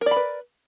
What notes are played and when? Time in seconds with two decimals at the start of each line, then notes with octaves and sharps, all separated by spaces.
0.01 A#4
0.06 D5
0.11 B5
0.16 B4